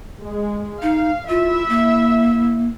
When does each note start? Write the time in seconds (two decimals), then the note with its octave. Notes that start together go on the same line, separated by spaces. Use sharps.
0.23 G#3
0.82 D#4 F5
1.29 E4 F4 E5
1.69 A#3